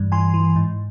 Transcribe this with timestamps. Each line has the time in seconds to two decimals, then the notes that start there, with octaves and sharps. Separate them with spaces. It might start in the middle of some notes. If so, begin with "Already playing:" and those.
Already playing: G2 E3 G3
0.12 E3 G#5 C6
0.34 E3
0.56 G#2